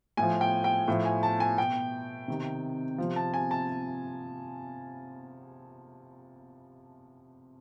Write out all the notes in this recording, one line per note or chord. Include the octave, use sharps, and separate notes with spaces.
A2 F3 G#5
G5
G5
A2 F3
G#5
A5
G#5
B2 G5
C3 D#3
C3 F3
A5
G#5
A5